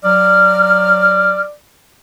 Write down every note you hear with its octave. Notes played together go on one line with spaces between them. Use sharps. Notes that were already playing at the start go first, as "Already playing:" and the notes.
F#3 D5 F6